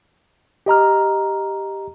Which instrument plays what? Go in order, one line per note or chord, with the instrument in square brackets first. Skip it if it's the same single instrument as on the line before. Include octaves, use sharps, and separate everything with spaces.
[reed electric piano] G4 D#5 A#5 F6